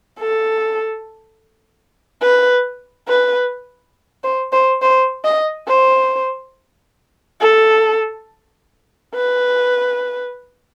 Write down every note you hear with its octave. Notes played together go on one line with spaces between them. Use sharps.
A4
B4
B4
C5
C5
C5
D#5
C5
A4
B4